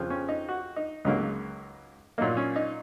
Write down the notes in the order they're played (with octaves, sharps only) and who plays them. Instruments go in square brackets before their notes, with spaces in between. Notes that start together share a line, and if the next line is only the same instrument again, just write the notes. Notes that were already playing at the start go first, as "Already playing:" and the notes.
Already playing: [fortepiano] F2 C#3 F3
C#4
D#4
F#4
D#4
C#2 C#3 F#3 A#3 D#4
A#2 F#3 A#3 D#4
C#4
D#4